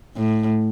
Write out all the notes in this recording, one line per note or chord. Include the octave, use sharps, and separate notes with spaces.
A2